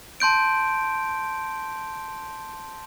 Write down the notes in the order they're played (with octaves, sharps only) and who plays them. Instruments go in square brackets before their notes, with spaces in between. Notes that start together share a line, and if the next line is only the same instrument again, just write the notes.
[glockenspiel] A5 C6 G6 D7